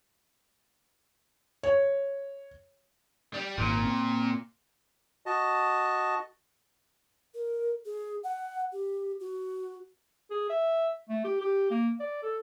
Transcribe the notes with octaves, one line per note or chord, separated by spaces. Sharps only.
C#5
G3
G#1 A#2
C4
F#4 D#5 A5
A#4
G#4
F#5
G4
F#4
G#4
E5
A3
G4
G4
A#3
D5
A4